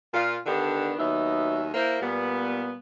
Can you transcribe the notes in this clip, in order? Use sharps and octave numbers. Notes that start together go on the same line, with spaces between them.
A#2 F4
D3 D#3 B3 D4 G4
D#2 F#3 B3 D#4 E5
A#3 E4 A#4 C5
A#2 G3 B3